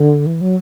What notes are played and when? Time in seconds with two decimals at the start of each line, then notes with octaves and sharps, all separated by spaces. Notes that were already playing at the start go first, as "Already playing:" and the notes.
Already playing: D3
0.26 E3
0.41 F#3